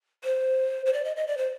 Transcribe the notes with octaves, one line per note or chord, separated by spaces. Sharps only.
C5
C5
D5
D#5
D#5
D5
C5